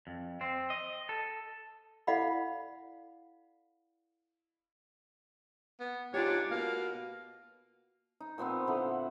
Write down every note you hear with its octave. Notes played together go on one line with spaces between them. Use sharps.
F2
C4
D#5
A4
E4 A4 D5 F5 F#5 B5
B3
G#2 D4 F4 G4 C#5
B2 A#3 F5
D#4
A#2 F3 B3 C4
D3 E4 A#4 F#5